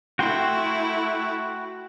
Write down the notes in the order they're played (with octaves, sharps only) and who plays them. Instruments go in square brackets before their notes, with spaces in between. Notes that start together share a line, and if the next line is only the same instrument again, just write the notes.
[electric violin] A3 E4 [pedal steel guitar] F#4 G5 C6